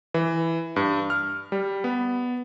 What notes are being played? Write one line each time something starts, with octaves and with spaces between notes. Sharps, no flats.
E3
G2
F6
G3
B3